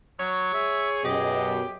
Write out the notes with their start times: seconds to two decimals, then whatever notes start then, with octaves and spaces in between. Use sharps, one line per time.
0.19 F#3 C#5
0.54 G#4 E5
1.04 F#2 B2 G4 D#5